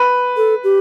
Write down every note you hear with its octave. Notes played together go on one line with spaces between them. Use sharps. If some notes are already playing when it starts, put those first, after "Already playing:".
Already playing: B4
A4
G4